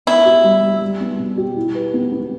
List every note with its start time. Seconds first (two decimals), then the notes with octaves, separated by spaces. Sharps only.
0.07 B3 E4
0.26 G4
0.44 G3
0.63 G3
0.81 G3
1.01 B3
1.19 B2
1.38 G4
1.57 E4
1.75 B4
1.94 B3
2.12 B3